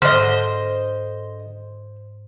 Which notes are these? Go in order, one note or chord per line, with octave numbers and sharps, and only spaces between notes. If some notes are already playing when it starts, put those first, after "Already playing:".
G#2 D3 C5 D#5 F6